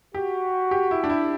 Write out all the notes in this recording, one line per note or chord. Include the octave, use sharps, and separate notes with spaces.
F#4 G4
G4
E4
D4
E4